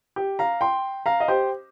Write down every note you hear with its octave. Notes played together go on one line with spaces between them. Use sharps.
G4
F5 A#5
G5 C6
F5 A#5
D#5
G4 C5